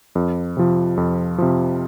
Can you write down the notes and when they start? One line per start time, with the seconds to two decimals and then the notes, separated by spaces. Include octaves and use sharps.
0.15 F2
0.57 C3 F3
0.97 F2
1.38 C3 F3